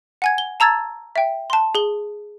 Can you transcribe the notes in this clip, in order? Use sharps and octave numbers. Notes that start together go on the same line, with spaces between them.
F#5 G#5 G#6
G7
A5 A#5 E6 G#6 A6
E5 G5
A5 C6
G#4 G7